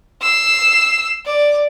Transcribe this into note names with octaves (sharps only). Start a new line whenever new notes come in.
E6 C7
D5